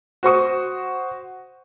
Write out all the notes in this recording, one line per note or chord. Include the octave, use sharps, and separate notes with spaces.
F#4 C5 C#6 D#6